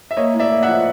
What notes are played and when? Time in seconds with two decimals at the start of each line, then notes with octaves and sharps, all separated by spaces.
0.11 E5
0.17 A#3 C#5 D#5
0.34 A2
0.39 D5 E5
0.51 A#3
0.63 E5 F#5
0.68 F3